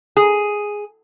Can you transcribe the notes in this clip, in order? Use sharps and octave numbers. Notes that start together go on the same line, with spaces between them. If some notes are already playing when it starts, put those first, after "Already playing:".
G#4